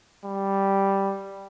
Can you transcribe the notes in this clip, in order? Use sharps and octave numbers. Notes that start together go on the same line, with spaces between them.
G3